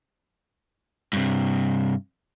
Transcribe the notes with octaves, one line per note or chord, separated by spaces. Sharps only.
G2 C3